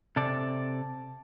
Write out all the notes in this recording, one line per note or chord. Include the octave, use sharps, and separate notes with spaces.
C3 A4 D5